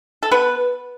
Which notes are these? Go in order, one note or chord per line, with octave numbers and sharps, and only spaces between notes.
A4
B3 B4